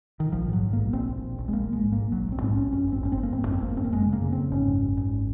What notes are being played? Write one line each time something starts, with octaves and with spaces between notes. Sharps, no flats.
D#3
A#1 F3
G#2 F#3
G#2
A#1 A#3
A#1 C4
A#1
A#1
A#1
G#3
A#1 A#3
A#1 G#3
G#2
A#3
A#1
A#1 F#3
A#1 C4
G#2 C4
A#1 C#4
F#2 C#4
G#1
C4
G#1 C#4
C4
G#1
A#3
G#1 C4
F#2
C4
G#1 A#3
G#1 C4
A#3
F#2 G#3
C#3
A#3
C#3
F#2 C4
G#1 C#4
F#2
F#2
G#1